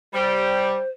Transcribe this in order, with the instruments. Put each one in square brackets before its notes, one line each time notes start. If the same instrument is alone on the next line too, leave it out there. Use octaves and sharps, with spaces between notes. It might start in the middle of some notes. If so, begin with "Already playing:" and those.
[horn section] G3 [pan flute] C5